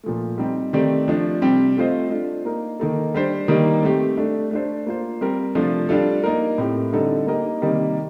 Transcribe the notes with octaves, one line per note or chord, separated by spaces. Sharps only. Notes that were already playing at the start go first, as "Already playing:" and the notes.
A#2 F3 A3
G3 C4 D#4 G4
D#3 A3 C4 G4 D5
F3 A3 D4
C3 G3 C4 G4
A3 C4 F4 C5 D#5
A3 D4 F4
A#3 D#4 A#4
D#3 A#3 D#4 A4
G3 D4 G4 C5
D#3 G3 A#3 D#4
A3 C4 G4
A3 D4 A4
A3 D4 A4 C5
A#3 F4 C5
G3 C4 G4 A#4
C3 F3 A3 D4 F4
G3 D4 F4 A4
A#3 D#4 A#4
A2 A3 C4 G4
D3 G3 C4 D#4 A4
A#3 D#4 G4 A#4 D#5
C3 D#3 G3 A#3 D#4